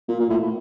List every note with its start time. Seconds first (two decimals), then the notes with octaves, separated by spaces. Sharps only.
0.08 A#2
0.20 A#2
0.30 A2